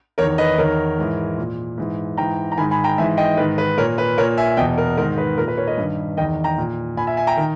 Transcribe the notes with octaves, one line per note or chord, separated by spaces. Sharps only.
E2 D#3 A#4 C#5
B4 D#5
E2 D#3 A#4 C#5
G#2 E3
A#2
G#2 E3
G#2 E3 G5 A#5
A#5
G#2 D#3 G#5 B5
G#5 B5
G5 A#5
G#2 E3 E5 G#5
D#5 G5
G#2 D#3 B4
B4
A#2 A#4 C#5
B4
A#2 A#4 C#5
E5 G#5
E2 B2 D#5 G5
A#4
G#2 D#3 A#4
B4
A#2 A#4
B4
A#4 C#5
B4 D#5
G2 D#3
E2 D#3 D#5 G5
G5 A#5
A#2
A#2 G#5 B5
E5 G#5
E5 G#5
G5 A#5
D#3